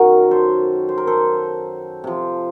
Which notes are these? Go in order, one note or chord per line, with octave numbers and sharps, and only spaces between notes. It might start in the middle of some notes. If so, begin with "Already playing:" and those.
Already playing: F#2 D#3 F#3 F#4 A#4
A4 C5
C5
A#4
A4 C5
C3 F3